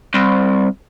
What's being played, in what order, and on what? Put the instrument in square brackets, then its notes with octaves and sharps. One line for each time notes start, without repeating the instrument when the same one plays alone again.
[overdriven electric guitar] C2